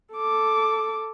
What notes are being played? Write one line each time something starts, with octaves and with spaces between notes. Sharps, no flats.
A4 D6